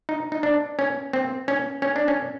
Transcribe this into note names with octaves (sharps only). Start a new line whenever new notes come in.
D#4
D#4
D4
C#4
C4
C#4
C#4
D4
C#4